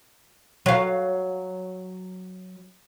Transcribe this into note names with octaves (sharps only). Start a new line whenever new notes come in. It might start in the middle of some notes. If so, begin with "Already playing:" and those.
F#3 F5